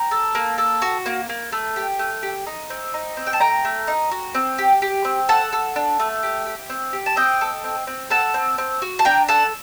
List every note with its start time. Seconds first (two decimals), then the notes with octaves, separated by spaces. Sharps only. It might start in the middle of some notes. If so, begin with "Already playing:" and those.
Already playing: G5 A#5
0.11 A4
0.35 A#3
0.58 A4
0.82 F#4
1.06 A#3
1.29 A#3
1.52 A3
1.76 G4
1.99 A3
2.23 G4
2.46 D#4
2.70 C4
2.94 D#4
3.17 C4
3.27 G5
3.33 A5
3.40 A3 G5 A#5
3.65 A3
3.87 D#4
4.12 F#4
4.35 C4
4.58 G4
4.82 G4
5.05 C4
5.29 A4 F#5 A5
5.53 A4
5.76 D4
6.00 A3
6.23 G4
6.46 G4
6.70 C4
6.93 G4
7.06 A5
7.16 C4 D#5 G5
7.41 A4
7.64 C4
7.87 C4
8.10 A4 F#5 A5
8.34 C4
8.58 C4
8.82 F#4
8.99 A5
9.05 D4 G5 A#5
9.28 A4 F#5 A5